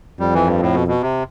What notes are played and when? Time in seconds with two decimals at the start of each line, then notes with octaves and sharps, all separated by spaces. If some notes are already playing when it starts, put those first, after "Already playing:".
0.20 F2 G3
0.34 E3
0.47 G2
0.61 A2
0.74 B2
0.88 B2
1.02 C3